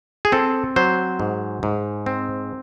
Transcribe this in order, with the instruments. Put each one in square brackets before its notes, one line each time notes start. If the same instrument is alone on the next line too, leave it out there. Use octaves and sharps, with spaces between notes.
[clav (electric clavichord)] G#4
C4 A4
F#3 C5
G#2
G#2
C4